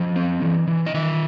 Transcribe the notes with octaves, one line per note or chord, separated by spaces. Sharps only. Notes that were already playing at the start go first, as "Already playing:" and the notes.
Already playing: F3 D#5
C4
E3
E3
D#5
D#3 E5